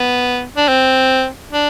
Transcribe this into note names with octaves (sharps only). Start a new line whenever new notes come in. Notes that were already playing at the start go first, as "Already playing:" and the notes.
Already playing: B3
D4
C4
D4